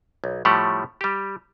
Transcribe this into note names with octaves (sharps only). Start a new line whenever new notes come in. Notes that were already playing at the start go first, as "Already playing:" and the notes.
B1
A2 F3 G3 A3 G4 F#5
G3 G4